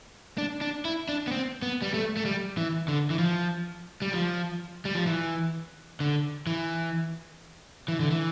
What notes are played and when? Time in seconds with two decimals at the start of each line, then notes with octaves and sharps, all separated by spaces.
0.38 D4
0.61 D4
0.85 E4
1.09 D4
1.27 B3
1.32 C4
1.62 B3
1.82 G3
1.94 A3
2.17 A3
2.25 G3
2.57 E3
2.88 D3
3.10 E3
3.19 F3
4.02 G3
4.13 F3
4.85 G3
4.95 F3
5.06 E3
6.00 D3
6.47 E3
7.88 E3
8.00 D3
8.11 E3